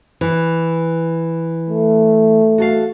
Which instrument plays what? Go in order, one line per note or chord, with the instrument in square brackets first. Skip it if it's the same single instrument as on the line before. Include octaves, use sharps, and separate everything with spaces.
[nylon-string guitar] E3
[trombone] A3
[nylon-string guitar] F#4 A4 F5